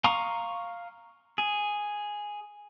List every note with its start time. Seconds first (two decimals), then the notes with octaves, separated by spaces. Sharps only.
0.04 F5 A#5 C6 C#6 D#6
1.38 G#4